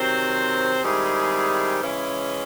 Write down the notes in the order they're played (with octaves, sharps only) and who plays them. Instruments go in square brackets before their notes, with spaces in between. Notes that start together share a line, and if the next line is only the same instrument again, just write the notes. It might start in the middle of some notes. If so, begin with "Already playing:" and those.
Already playing: [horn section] C3 D#3 F#3 C4 C5
D#3 G3 G#3 C4 E4 G#4
C#3 E3 G#3 C#4 E4